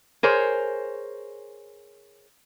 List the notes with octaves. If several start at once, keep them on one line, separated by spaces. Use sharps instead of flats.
G#4 A#4 C5 C#5